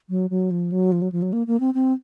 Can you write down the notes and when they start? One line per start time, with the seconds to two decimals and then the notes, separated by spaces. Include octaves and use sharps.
0.10 F#3
0.30 F#3
0.51 F3
0.72 F#3
0.92 F3
1.02 F#3
1.12 F3
1.22 F#3
1.33 A#3
1.47 A#3
1.60 C4
1.74 C4